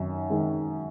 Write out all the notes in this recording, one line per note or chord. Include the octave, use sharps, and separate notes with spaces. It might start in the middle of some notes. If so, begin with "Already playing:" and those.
Already playing: F#2 D#3
D#3 G#3